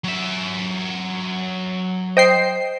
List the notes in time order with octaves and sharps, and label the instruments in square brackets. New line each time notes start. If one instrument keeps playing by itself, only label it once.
[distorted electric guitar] F#3 E5
[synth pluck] C5 [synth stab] D#5 G5 C7